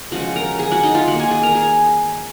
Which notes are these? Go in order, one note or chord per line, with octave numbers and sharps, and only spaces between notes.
C#3 F3 G#3 F#4 F#5
A#4 A#5
G#4 G#5
F#4 F#5
D#4 D#5
F4 F5
D#3 A#3 F#4 F#5
G#4 G#5
G#4 G#5
A#4 A#5
G#4 G#5